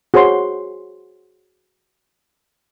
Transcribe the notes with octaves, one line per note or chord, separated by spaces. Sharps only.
F#4 G#4 C5 C#5 C6